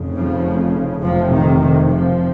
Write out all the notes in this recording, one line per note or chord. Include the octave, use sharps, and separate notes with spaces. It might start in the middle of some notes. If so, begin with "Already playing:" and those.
Already playing: F1 F2 C#3
F3
F1 F2 C3 F3
D#3
D#3
F3